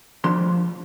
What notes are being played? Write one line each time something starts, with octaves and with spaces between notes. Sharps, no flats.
F3 D4 C6